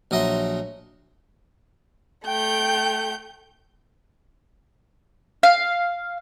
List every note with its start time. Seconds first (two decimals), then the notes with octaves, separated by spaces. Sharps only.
0.11 A#1 F#3 D#5 E5 C6
2.26 A3 G5 G6
5.43 F5